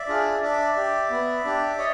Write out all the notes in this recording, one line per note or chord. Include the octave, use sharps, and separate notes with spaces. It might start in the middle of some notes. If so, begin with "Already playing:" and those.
Already playing: D5 E5
D4 F4 G#4
D4 D5 E5
G4
B3
D4 G4
C#5 D#5